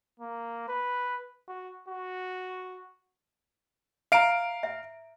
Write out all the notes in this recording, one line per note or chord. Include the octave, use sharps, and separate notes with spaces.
A#3
B4
F#4
F#4
E5 F5 A#5 D7
E5